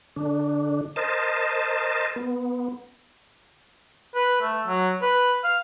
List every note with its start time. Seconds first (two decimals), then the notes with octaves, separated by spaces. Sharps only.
0.16 D3 D4
0.96 A#4 C5 D#5 A5
2.16 B3
4.15 B4
4.41 A3
4.67 F#3
5.02 B4
5.44 F5